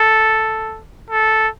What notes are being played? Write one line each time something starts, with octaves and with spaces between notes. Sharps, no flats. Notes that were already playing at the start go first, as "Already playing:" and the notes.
Already playing: A4
A4